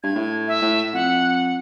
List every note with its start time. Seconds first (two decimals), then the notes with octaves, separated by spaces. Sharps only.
0.03 G2 G#6
0.15 A2
0.48 E5
0.62 A2
0.93 F2 F#5